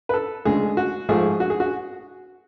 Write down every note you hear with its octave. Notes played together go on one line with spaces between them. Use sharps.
B4
A4
D2 C#3 G#3 G#4
F#4
G#2 F3 A3 G#4
F#4
G#4
F#4